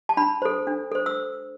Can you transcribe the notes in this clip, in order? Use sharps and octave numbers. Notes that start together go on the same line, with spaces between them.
A5
D4 B5
A4 C5
D4
A4 C5
E6